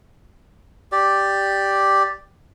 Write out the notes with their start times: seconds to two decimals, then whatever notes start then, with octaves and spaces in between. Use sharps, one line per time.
0.92 G4 D5